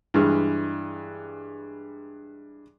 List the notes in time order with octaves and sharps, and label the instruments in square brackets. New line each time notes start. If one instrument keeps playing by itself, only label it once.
[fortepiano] G2 E3 G#3 F6